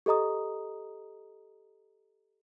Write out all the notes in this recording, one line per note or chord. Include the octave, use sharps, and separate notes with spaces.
G4 A4 D#5 A#5 D#6